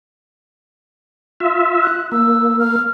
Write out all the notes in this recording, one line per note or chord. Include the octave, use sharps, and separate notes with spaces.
F4 E5
F#6
A#3 E6
F6